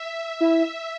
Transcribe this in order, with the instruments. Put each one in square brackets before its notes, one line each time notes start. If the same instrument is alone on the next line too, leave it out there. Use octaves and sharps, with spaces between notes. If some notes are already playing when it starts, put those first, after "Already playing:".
Already playing: [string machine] E5
[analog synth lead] E4